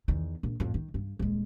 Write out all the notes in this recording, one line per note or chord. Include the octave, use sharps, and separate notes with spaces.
E2 D#3
A#1
F2 A2
D#3
G2
D#1 G#3